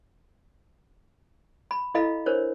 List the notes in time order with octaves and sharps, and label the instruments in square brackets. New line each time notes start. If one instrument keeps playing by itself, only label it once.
[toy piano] B5
E4 A4 D#5 F5 B5
D4 A#4 C5 C#5